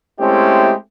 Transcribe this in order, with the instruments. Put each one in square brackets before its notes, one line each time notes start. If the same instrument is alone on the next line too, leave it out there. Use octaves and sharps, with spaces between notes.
[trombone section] G#3 A3 C4 C#4 E4 G4